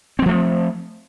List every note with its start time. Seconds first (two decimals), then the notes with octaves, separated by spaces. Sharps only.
0.19 C4
0.22 F#3
0.26 F3
0.29 A3